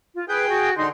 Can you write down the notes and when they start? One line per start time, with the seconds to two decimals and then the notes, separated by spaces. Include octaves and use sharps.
0.15 F4
0.29 G#4 B4 G5
0.49 F#4
0.77 D3 D#4 C6